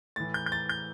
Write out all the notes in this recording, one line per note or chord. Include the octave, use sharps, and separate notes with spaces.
A2 E3 A6
G6
G6
A6
G6